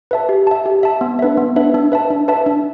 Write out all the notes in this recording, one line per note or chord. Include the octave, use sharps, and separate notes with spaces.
B4 E5 A5
G4
E5 A5
G4
E5 A5
B3
D4 B4 E5
B3
D4 B4 E5
D4
B4 E5 A5
D4
B4 E5 A5
D4